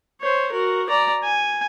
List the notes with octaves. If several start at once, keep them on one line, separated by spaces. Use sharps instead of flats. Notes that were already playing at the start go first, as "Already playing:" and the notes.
C5 C#5
F#4 A#4
D5 A#5
G#5